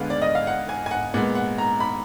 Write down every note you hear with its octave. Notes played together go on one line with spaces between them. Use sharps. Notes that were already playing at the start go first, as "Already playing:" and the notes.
Already playing: D2 D3 G#3 B3 F5
D5
D#5
F5
F#5
G#5
G#5
F#5
A#2 G#3 B3 F#5
F#5
A#5
B5